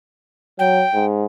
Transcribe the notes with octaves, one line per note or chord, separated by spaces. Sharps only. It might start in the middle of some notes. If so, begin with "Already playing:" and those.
F#3 G5
G#2